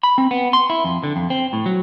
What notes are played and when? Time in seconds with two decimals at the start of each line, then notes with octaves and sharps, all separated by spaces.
0.03 B5
0.18 C4
0.31 B3
0.53 C6
0.70 E4
0.84 F2
1.04 D3
1.16 F2
1.30 C4
1.53 A2
1.66 F#3